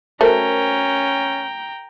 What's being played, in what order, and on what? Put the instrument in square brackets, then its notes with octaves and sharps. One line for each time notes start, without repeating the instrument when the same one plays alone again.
[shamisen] A3 [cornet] C#4 [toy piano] F#4 A#4 C5 [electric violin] G5 A#5